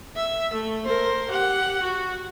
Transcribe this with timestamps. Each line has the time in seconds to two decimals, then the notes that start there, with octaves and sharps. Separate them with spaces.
0.16 E5
0.53 A3
0.85 A#4 C5
1.28 G4 F#5
1.82 F#4